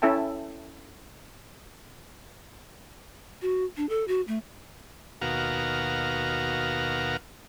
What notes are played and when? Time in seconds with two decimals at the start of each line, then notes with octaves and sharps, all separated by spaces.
0.02 C#4 E4 A4 E5 G5 A5
3.42 F#4
3.77 D4
3.89 A4
4.08 F#4
4.28 A3
5.22 D#2 B2 F#4 A#4 F5